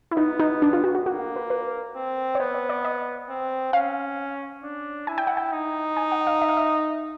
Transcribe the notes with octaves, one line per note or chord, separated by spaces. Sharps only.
E4
B3 D#4
D#4
D4
F4
F#4
F#4
A#3 F#4
B4
B4
C4
C#5
B3 C5
C#5
D5
D#5
C4
C#4 F5
D4
E4 G#5
G5
F#5
G5
D#4
G#5
F#5
F5
E5
F5
E5